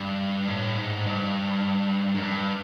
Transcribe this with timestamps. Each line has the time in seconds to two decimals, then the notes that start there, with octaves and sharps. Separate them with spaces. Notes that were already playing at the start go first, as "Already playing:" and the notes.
Already playing: G2
0.48 A2
0.78 G#2
1.06 G2
2.15 F#2
2.23 G2